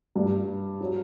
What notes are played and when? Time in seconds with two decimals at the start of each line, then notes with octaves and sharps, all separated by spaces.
0.15 G2 G3
0.81 F#3